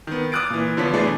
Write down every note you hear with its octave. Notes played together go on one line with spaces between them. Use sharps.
D#3 B3
D6 D#6 F6 F#6 A6 D7
A#2 E3
D3 F3 B3 C#4 D4 B6
B2 D3 E3 A3 D4 G#4